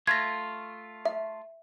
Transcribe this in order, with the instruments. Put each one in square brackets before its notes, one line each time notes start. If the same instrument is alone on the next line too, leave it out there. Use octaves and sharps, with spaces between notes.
[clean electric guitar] A3 F4 [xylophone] G#6 A#6
[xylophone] E5